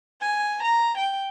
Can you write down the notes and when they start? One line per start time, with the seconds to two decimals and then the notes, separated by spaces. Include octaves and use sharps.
0.21 G#5
0.63 A#5
0.97 G5